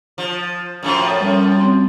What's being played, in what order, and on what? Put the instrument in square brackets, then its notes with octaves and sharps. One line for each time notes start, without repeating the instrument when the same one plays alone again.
[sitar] F3
F#2 A2 F3
[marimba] G3 C#4
C4 C6